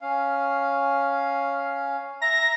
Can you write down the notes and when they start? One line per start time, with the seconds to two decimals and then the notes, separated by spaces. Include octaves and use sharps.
0.01 C#4 F5
2.22 E5 A#5 A#6